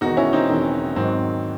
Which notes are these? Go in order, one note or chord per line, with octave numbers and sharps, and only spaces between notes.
E1 E2 D#3 D#4 F#4
C#4 E4
C4 D#4
E1 E2 D#3
G#1 G#2 D#3 F#3 C4